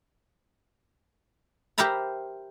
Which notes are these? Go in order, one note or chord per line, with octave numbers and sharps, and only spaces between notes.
G4 A#4 C5 E5 A#5 B5